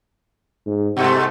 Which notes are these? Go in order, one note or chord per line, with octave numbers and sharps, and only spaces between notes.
G#2
G2 C3 G#3 A3